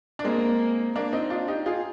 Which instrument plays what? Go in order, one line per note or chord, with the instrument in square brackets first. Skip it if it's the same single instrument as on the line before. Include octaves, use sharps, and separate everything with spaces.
[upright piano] D4
[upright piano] G#3 C4 [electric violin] A#3
[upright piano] A#3 D4
C4 D#4
D4 F4
D#4 G4
F4 G#4